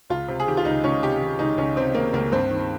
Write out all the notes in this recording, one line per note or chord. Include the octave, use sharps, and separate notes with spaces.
C#2 F4
C3
G#4
D#3 G4
F4
C#2 D#4
C#2 C#4
C3 G4
D#3
C#2 D#4
C#2 C#4
C3 C4
D#3 A#3
C#2 A#3
G2 C4
D#3